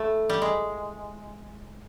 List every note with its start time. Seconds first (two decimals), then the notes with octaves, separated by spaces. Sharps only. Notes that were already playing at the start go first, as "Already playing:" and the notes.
Already playing: A3 E4
0.30 G3
0.42 G#3